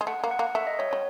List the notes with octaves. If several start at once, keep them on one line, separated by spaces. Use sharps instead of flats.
G#3
A3 F#5
A#3
F#5
A#3
A3 E5
D#5
G3 C#5
G3 C#5